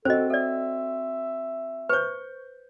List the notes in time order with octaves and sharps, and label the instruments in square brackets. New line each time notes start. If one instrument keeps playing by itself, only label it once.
[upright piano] C4 F#4 [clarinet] A4 [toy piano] C5 D#5
[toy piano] A4 D5 [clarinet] E5
[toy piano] B4 C5 [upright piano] C#6 G6